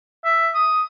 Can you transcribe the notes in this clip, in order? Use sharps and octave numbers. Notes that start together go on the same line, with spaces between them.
E5
D#6